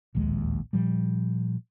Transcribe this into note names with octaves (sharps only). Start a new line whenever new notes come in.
D1 A#1 D#2 G#3
A#2 F3 G3